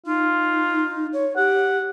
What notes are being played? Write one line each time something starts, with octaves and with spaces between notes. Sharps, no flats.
D#4 F4
C#5
G4 F#5